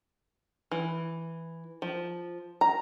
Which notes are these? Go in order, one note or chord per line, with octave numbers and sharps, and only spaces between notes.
E3
F3
A#5